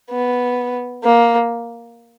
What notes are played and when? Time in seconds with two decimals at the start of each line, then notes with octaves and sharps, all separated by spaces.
0.10 B3
1.03 A#3